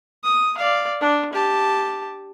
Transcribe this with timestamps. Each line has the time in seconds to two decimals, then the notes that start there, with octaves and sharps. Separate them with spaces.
0.24 D#6
0.58 D5 F5
1.01 D4
1.33 G4 A5